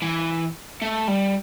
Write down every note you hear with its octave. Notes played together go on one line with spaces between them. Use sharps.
E3
A3
G3